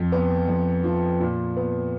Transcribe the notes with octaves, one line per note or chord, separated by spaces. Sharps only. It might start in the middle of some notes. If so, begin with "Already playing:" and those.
Already playing: F2
B3
F2
F3
A#2
B3